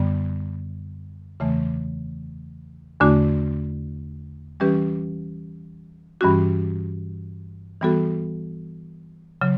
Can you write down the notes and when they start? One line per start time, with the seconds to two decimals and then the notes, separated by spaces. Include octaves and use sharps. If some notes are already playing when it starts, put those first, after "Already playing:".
Already playing: F#2 D3 G3 B3
1.40 E2 C#3 E3 A3
3.01 E2 D3 A3 D4 F#4
4.60 E3 G3 C#4 G4 B4
6.21 G2 E3 G3 C#4 F#4
7.81 E3 G3 B3 F#4 A4
9.41 C#3 F#3